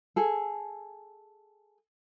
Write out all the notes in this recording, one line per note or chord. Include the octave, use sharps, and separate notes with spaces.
G#4 A4